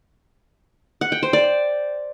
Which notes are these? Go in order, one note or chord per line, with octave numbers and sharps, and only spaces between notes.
F#5
G5
C5
D5